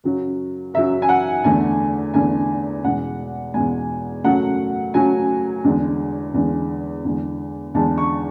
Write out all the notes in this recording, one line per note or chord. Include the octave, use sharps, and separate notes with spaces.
F#2 C#3 F#3
F#2 C#3 F#3 E5
G#5
F#5
E2 D3 A3 G#5
E2 D3 A3 G#5
E2 B2 G#3 F#5
E2 B2 G#3 G#5
F#2 C#3 F#3 A3 F#5
F#2 C#3 F#3 A3 G#5
E2 D3 G#3
E2 D3 G#3
E2 D3 G#3
E2 D3 G#3 A5
C#6